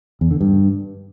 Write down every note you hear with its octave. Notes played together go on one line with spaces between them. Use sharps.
E2
D3
G2